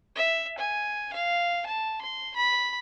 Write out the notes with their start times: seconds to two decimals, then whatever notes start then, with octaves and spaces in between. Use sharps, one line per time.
0.15 E5
0.58 G#5
1.13 F5
1.66 A5
2.02 C6
2.36 B5